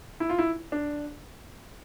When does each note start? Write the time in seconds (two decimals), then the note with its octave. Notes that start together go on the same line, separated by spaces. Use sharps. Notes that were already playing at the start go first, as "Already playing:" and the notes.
0.20 E4
0.29 F4
0.39 E4
0.72 D4